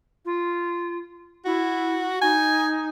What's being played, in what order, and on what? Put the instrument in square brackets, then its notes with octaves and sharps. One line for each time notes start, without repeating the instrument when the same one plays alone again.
[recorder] F4
[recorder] E4 [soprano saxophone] F#4
[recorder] D#4 [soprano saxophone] G#5